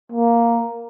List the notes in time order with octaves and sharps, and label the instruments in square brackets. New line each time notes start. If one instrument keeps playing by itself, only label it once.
[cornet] A#3